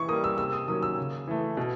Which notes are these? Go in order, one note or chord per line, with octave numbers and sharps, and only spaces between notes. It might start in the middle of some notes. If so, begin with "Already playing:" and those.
Already playing: E3 C#6
G3 A#3 D#6
E6
C3 E6
D#6
D#3 F#3 A#3 C#4 D#6
E6
C#3
E3 A3
B2